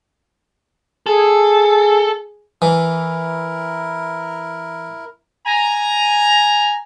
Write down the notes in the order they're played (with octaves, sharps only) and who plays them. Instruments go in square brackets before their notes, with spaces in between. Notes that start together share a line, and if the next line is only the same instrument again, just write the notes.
[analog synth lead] G#4 [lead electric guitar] A4
[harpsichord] E3 [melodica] E4 A#4
[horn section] G#5 A#5